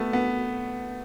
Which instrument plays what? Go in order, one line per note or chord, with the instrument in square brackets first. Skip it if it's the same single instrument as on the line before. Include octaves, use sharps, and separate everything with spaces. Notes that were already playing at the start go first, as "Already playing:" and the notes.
Already playing: [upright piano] A3 B3
B3